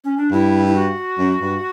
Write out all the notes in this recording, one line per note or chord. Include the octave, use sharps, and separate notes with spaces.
C#4
D4
G2 E4
E4
F#4
F#2
G2